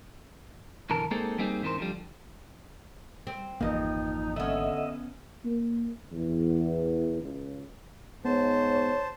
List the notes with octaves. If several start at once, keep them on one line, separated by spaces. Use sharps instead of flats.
B1 F#2 D3 E3 A#4 A5
G#3 A#3 C4 D#4 G#4 A4
G3 A#3 C4 D#4 G#4
G#2 E3 C4 D#4 A#4 C5
D3 F3 G3
C4
G#1 F2 E3 A#3 D#4 D#5
D3 B3 C#4 D#5 E5
A#3
E2
C#2
G#2 B3 C5 C#5 A5